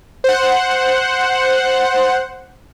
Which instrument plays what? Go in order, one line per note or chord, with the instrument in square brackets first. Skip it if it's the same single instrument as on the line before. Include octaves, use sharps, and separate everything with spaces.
[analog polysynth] C5 F#5